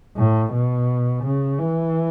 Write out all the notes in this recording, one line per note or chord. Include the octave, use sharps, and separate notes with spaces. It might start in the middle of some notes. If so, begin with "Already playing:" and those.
A2
B2
C#3
E3